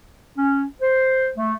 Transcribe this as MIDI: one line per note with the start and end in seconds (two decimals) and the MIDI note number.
0.37 0.65 61
0.81 1.30 72
1.37 1.54 57